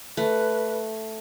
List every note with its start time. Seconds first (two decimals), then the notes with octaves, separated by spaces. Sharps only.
0.17 A3 B4